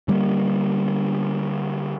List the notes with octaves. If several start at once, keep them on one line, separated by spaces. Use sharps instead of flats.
D3 G3 A3 A#3